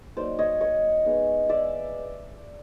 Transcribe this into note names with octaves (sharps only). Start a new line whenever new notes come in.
F#3 A#3 D#4 C5 D5
C#5 D#5
C#5 D#5
G#3 B3 D#4
D5 E5